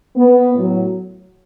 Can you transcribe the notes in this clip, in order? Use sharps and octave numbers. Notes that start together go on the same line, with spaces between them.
B3
A2 F#3